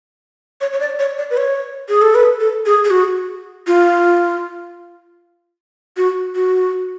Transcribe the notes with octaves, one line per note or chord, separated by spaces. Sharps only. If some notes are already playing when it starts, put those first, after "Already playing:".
C#5
C#5
D5
C#5
D5
B4
C#5
G#4
A4
B4
A4
G#4
G#4
F#4
F4
F#4
F#4